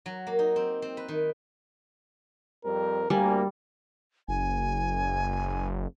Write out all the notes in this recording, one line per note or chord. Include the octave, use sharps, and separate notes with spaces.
F#3
A#3
D#4
C4
C4
B4
D#3
F2 G3 C4 A#4
D2 G3 A#3 G#5
F#1 G#5